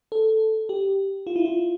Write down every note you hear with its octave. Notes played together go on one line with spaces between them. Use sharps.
A4
G4
F4
E4
F4